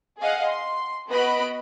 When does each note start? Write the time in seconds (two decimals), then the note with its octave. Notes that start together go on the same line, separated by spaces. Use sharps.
0.20 G#4 D#5 F5 F#5
0.49 C6
1.10 B3 F#4 B4 D#5 B5 D7